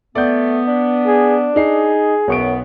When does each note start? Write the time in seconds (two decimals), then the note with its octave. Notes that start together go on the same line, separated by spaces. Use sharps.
0.15 A3 B3 D5 G6
0.68 D4
1.07 G#4
1.56 D#4 G#4 C7
2.28 B1 F#2 B3 C#6 D7